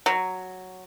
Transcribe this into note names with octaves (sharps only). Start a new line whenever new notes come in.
F#3